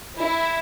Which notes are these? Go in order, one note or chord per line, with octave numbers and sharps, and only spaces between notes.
E4